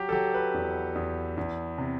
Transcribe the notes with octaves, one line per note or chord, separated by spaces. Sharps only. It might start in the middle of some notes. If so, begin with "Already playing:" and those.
Already playing: F#3 G4
A4
F#3 G4
B4
E2
E2
E2
C3